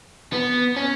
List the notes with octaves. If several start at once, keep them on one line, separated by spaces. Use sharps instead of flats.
B3
C#4